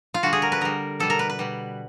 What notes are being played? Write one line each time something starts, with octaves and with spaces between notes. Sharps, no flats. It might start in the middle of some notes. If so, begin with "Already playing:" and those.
F4
D3 G3 F#4
G#4
A#4
B4
D3 G3 A#4
B2 G3 A4
A#4
B4
B4
B2 G3